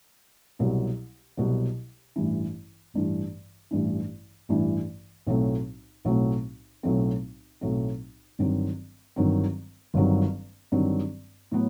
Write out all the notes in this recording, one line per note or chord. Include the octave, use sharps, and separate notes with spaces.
C2 B2 F#3
C2 B2 F#3
A1 G2 E3
A1 G2 E3
A1 G2 E3
A1 G2 E3
B1 A2 F#3 A3 C4
B1 A2 F#3 A3 C4
B1 A2 F#3 A3 C4
B1 A2 F#3 A3 C4
G1 G2 D#3 F#3 C4
G1 G2 D#3 F#3 C4
G1 G2 D#3 F#3 C4
G1 G2 D#3 F#3 C4
A2 F#3 B3